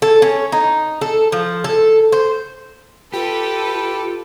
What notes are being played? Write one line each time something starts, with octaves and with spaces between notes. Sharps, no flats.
A4
C#4
D#4
A4
F3
A4
C5
F4 G4 A4 B4